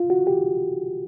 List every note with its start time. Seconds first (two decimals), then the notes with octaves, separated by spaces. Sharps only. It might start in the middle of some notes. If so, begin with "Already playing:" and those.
Already playing: F4
0.10 F#4
0.27 G4